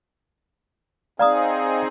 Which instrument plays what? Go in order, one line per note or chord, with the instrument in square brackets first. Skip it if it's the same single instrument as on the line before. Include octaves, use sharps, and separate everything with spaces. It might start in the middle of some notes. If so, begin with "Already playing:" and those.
[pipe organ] C4 D#4 G#4 [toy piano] D5 A#5 D#6 [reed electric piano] F5